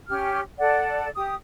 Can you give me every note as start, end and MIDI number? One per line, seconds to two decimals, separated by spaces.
0.09 0.40 61
0.09 0.40 67
0.09 0.40 89
0.59 1.08 69
0.59 1.08 74
0.59 1.08 78
1.15 1.34 67
1.15 1.34 87